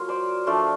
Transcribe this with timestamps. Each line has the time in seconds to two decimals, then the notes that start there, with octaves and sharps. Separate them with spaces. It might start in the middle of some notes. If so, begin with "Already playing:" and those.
Already playing: F#3 A#3 F4
0.08 C5 D5
0.47 F3 A3 D4 F4